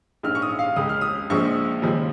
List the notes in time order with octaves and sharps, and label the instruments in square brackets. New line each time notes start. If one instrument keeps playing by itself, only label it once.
[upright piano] A#1 G#2 G#3 F6
C#6
D#6
F5
C#2 C#3 G#3 D#6
F6
D#6
A#1 A#2 F3 G#3 C#6
D#2 C#3 F3 G#3